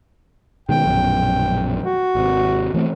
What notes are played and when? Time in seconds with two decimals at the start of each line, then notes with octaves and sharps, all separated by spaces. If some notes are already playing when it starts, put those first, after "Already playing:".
0.69 B2 D#3 G#3 G5
0.86 A#1 F#2 B2
1.84 F#4
2.15 G#1 C3
2.74 E3 A3 C4